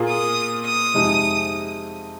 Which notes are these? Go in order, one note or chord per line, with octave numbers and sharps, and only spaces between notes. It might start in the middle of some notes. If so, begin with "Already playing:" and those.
Already playing: A#2 A#3 F4 G#4
D#6
D#6
F2 C3 G#3 D#4